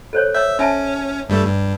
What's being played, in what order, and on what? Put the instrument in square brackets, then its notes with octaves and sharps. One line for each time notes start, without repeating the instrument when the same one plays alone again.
[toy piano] A4 C5 C#5
[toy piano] C#5 E6 [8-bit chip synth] E5
[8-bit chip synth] C#4 [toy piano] E5 G#5 A5
[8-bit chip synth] G2 G3 A3
G2